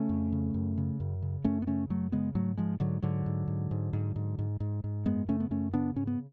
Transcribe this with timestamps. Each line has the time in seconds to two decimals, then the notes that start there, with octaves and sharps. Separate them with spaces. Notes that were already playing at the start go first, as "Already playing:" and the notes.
Already playing: C#3 A3 C#4
0.09 F2
0.32 C#3
0.54 F#2
0.78 C#3
1.00 F#2
1.22 C#3
1.44 F#2 A3 C#4
1.62 B3
1.67 C#3 A3 C#4
1.90 F#2 F#3 A3
2.12 C#3 G#3 B3
2.35 G#2 F#3 A3
2.57 G#2 F3 G#3
2.80 G#2 D3 F#3
3.02 G#2 D3 F#3
3.26 G#2
3.48 G#2
3.71 G#2
3.93 G#2
4.16 G#2
4.39 G#2
4.60 G#2
4.84 G#2
5.05 F#2 G#3 B3
5.28 C#3 A3 C#4
5.40 B3
5.51 F#2 A3 C#4
5.73 C#3 B3 D4
5.96 G#2 C#4
6.07 B3